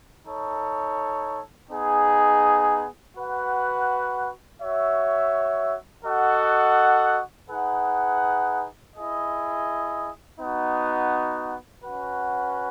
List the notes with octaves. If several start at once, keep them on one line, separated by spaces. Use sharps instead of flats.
D#4 A4 C#5
B3 D#4 G#4
F#4 B4 F#5
F#4 C#5 E5
F#4 A4 D#5 F#5
D#4 G#4 B4 F#5
E4 G#4 D#5
B3 D#4 F#4
C#4 F#4 B4 F#5